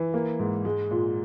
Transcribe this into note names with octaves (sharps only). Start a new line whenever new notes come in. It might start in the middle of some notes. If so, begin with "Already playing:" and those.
Already playing: E3
A#3
G#2
G#3
A#2